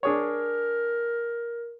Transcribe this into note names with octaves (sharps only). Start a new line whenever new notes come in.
D4 G#4 A#4 C#5